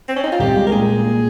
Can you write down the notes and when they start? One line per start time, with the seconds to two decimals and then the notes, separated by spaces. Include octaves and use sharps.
0.08 C4
0.16 C#4
0.24 D#4
0.32 F4
0.39 C2 G4
0.57 G#3
0.67 A#4
0.72 A#2 G#4
0.89 A#2